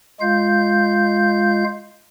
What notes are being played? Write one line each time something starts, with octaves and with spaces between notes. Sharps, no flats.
G#3 F4 F5 G6